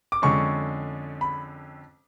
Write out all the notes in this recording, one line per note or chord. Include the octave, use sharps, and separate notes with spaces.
D6
F2 D3 G#3 C#4 C#6
B5